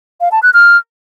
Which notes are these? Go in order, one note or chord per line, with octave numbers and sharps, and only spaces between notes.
F5
A5
F#6
F6